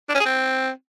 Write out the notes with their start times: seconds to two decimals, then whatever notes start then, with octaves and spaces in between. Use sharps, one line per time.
0.09 D4
0.15 C#4
0.20 G#4
0.25 C4